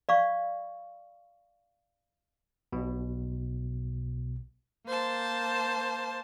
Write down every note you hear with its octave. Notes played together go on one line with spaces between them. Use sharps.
D5 F5 C#6
B1 B2
A#3 C5 A5